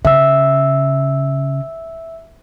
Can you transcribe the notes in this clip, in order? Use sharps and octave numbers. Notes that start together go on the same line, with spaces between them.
C#3 E5 E6